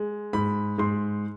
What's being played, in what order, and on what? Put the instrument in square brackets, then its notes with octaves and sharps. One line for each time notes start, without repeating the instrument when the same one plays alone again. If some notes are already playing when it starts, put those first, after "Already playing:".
Already playing: [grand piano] G#3
G#2 B5
G#2 C6